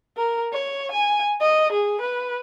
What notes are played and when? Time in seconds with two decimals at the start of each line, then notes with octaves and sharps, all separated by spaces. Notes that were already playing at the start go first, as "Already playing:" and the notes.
0.17 A#4
0.52 C#5
0.92 G#5
1.41 D#5
1.72 G#4
2.01 B4